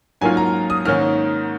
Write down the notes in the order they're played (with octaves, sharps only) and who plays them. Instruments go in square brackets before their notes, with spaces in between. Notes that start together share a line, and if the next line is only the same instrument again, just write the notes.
[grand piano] G#2 F#3 A#3 C#4 F4 G#5
A#5
D#6
G#2 D#3 A#3 C#4 F6